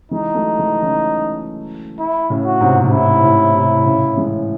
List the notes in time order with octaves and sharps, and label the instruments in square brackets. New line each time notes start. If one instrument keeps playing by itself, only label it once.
[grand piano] E3 G#3 [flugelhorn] D#4
[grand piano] F#3 A3
E3 G#3
C#3 E3
[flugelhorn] E4
[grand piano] A2 C#3
[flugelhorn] F#4
[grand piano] G#2 C3
A2
[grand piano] G#2 [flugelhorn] E4
[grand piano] A2
G#2 C3
A2 C#3
E3 G#3